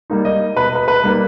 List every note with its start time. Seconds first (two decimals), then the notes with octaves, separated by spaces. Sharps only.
0.10 G3 A#3 D#4
0.25 D#5
0.56 B2 B4
0.75 B4
0.88 B4
1.04 G3 A#3 D#4